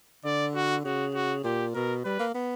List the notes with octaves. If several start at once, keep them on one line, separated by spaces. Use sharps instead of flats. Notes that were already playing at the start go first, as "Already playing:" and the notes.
D3 D5
F#4
C#3 F#4
F#4
A#2 G4
B2 A#4
G3 B4
A#3
B3